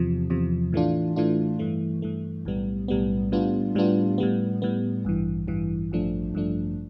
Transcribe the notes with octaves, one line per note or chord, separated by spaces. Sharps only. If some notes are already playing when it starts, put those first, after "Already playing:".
Already playing: E2 C3 F3
E2 C3 F3
A2 E3 A3 D4 F4
A2 E3 A3 D4 F4
G2 E3 A3
G2 E3 A3
B1 A2 G3 B3
B1 A2 G3 B3
A2 G3 B3 D4 F4
A2 G3 B3 D4 F4
A2 G3 B3
A2 G3 B3
A1 G2 E3
A1 G2 E3
A1 G2 F3 A3 D4
A1 G2 F3 A3 D4